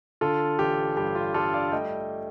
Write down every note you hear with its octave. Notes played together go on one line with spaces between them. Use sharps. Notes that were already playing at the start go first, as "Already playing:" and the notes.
D3 F4 A4
A1 G4
G2 G4
F4
G3 F4 A4
D5 F5
A3 D#5 G5